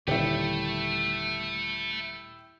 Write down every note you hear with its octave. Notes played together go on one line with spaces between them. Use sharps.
D#1 D3 A3 E4 G4